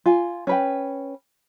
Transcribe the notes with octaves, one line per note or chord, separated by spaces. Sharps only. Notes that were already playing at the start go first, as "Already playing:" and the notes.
F4 G#5
C#4 B4 G5